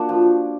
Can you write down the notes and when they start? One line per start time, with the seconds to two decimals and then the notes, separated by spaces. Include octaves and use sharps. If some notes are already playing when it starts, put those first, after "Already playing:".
Already playing: A#3 D4 F#4
0.09 F3